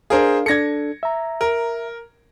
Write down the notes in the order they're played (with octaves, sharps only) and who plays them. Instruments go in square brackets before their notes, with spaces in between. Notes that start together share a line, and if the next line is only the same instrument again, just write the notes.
[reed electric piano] D4 F5 [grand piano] G#4 A#4 C5
[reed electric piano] D4 A4 [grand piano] G#6 A#6 C#7
[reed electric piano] E5 A#5
[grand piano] A#4